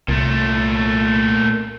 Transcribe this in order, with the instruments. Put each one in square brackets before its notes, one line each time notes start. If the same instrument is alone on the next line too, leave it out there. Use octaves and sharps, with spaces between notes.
[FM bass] C2 [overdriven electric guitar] A#2 A3